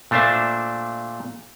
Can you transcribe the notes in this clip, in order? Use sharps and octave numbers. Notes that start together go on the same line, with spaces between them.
A#2 A3 D4 C5 E5 A5